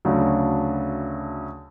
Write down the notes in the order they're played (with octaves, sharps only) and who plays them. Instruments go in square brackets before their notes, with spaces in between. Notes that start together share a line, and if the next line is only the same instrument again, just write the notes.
[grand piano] D2 C#3 F#3 A3 D4